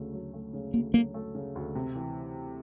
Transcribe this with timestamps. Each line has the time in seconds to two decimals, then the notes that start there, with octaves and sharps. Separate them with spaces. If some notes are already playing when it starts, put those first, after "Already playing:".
Already playing: D2 C#3 A3
0.13 F#3
0.34 A3
0.53 C#3
0.74 D2 A#3
0.94 F#3 A#3
1.14 A3
1.35 C#3
1.55 D2
1.75 C3
1.95 E3